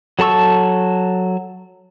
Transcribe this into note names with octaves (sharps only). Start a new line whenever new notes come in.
F#3 A4 A5 C#6 E6